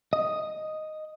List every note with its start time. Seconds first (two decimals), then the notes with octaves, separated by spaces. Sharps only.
0.13 D#5